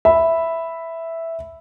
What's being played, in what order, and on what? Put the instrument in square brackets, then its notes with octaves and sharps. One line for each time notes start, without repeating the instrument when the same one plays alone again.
[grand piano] E5 B5